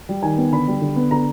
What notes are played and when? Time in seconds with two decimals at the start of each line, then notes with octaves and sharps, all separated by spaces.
0.09 G3
0.23 D#3 G#5
0.37 B3
0.52 D3 B5
0.68 G3
0.81 D3
0.96 B3
1.11 D3 A#5